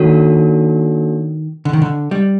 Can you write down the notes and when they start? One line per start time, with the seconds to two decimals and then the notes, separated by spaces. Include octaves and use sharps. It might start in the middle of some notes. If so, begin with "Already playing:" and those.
Already playing: D#3 A#3 D4 F#4 A4 C#5
1.65 D3
1.73 D#3
1.82 D3
2.11 G3